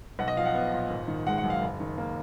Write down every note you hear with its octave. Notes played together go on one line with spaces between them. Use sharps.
B1 F#5
D#5
F3 F5
F#5
B3
A#2
G#1
D#3
G#3 F#5
F#5
F#2
F5
F#1
D#3
A#3